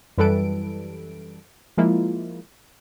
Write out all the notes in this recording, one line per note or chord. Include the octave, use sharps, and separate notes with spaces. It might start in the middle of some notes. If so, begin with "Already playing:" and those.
F#2 E3 G3 A4 B4 D7
F3 G#3 A#3 E4 F4